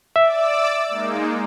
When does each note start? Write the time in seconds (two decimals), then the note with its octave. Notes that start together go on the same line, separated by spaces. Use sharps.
0.16 D5 E5 D6 E6
0.88 G#3 A#3 D#4